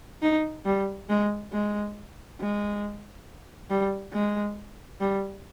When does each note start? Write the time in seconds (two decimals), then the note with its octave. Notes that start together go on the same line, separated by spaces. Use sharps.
0.22 D#4
0.65 G3
1.09 G#3
1.52 G#3
2.40 G#3
3.70 G3
4.13 G#3
5.01 G3